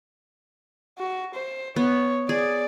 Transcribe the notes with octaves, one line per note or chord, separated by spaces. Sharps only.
F#4
C5
B3 C#5
G#4 D5